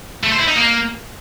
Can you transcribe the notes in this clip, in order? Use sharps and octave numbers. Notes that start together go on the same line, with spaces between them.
A3
C5
E4
D#4
A#3